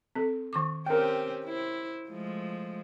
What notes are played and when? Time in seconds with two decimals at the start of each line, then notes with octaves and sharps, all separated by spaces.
0.15 C4 A4
0.53 D#3 C#6 D6
0.86 C4 C#4 G4 A#4 G5
1.45 E4 C5
2.10 F3 G#3 A3